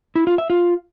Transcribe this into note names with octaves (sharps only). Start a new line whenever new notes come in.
E4
F4
E5
F4